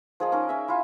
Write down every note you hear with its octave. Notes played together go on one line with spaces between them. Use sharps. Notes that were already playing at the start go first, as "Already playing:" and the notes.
F3 G#4 A#4 D#5
C#4 D#4 A#4
C#4 E5
E4 F4